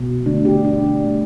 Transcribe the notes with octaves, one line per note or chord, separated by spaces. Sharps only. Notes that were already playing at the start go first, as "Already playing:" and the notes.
Already playing: B2
D3 A3 D4
G4
B2 G3 D4
D3 A3